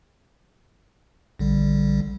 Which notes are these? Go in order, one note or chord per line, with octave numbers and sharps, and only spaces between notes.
A#1 D3 G3